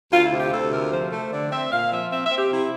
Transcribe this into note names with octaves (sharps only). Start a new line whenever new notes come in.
D2 F4
E4
C3
G4
D2 A4
C3 A#4
F3 C5
A3
D3 D5
C4 E5
A#2 F5
F3 E5
C4 E5
E5
C4
G4
C3 E4